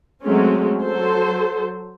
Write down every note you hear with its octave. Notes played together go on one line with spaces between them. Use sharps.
F#3 G#3 A3 C4 C#4
F#3 A4 C5